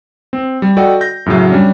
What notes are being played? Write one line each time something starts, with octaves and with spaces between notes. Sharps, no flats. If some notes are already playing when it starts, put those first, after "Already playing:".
C4
G3
F#4 A4 D5 D#5 G5
G6 A#6
F#2 A2 C#3 F#3
G3 C#4 D4